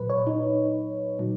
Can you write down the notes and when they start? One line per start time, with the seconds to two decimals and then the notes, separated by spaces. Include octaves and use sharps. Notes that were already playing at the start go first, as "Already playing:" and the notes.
Already playing: A#2 F#3 B4
0.10 C#5
0.27 D#4
1.19 A#2 F#3